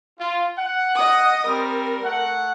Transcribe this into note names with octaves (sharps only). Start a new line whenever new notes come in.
F4
F#5
D#5 D#6
G3 C4 A#4
A3 F#5